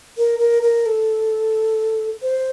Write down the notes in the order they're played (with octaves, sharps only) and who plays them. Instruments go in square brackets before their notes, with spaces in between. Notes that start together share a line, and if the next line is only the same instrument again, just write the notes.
[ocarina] A#4
A#4
A#4
A4
C5